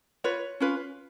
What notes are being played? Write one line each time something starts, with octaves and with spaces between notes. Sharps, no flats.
F4 B4 C#5
C#4 F4 B4